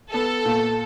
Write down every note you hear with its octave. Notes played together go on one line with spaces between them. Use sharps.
B3 A4
A#2